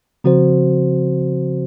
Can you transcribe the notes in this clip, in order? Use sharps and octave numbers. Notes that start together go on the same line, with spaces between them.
C#3 F3 C4 F#4 C5